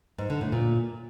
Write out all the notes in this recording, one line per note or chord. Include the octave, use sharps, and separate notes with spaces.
G#2
D3
A2
A#2